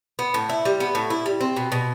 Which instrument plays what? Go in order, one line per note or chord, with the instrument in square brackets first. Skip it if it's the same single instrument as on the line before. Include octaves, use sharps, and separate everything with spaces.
[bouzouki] B3
A2
E4
G3
B3
A2
E4
G3
C4
B2
B2